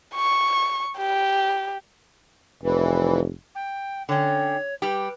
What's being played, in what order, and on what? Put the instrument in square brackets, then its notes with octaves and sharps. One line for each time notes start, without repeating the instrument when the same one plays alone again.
[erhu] C#6
G4
[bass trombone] F1 [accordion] E3
[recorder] G5
[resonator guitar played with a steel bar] D3 C#4 [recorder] C#5 [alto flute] G5
[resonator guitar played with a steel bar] G3 G4 [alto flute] B4